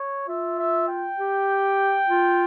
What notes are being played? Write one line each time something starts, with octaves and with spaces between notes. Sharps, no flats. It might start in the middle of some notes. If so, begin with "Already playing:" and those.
Already playing: C#5
F4 E5
E5
G5
G4
F4